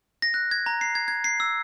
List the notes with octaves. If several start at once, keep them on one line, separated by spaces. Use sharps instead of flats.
A#6
F#6
G#6
A#5
C7
G#6
G#6
C7
E6